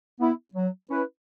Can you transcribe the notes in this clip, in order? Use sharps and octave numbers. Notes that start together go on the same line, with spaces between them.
B3 E4
F#3
C#4 E4 B4